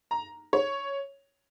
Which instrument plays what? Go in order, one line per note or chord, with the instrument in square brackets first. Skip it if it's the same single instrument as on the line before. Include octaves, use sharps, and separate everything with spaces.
[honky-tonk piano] A#5
C#5